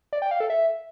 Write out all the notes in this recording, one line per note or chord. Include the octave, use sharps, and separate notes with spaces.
D5
G5
F5
A4
E5